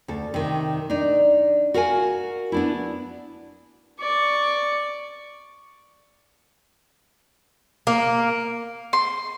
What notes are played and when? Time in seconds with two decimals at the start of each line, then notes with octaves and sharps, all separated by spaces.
0.08 D2 A4
0.34 C3 D#3
0.90 D4 D#4
1.74 F#4 A#4 F5 F#5 G#5
2.52 B3 D4 E4
3.99 D5 C#6
7.87 A#3
8.93 C6